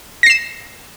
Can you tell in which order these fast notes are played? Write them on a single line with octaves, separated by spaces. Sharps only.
A#6 C7 E7